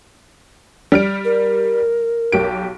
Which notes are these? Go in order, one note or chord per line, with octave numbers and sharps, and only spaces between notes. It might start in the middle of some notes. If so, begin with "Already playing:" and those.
G3 F6 D7
A#4
B1 G4 D7